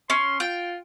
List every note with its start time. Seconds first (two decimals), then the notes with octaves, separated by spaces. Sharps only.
0.10 C#4 C6
0.40 F4 G5